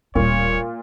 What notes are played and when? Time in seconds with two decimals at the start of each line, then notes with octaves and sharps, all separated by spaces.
0.15 D1 A#2 G3 C#5